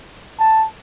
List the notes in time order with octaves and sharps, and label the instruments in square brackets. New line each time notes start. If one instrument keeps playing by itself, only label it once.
[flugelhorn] A5